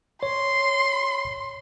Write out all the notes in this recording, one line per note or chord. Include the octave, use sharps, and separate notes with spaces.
C#5 C6